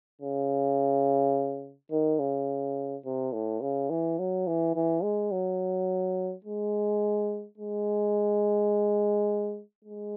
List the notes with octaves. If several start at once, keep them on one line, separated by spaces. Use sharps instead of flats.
C#3
D#3
C#3
C3
A2
C#3
E3
F#3
E3
E3
G#3
F#3
G#3
G#3
G#3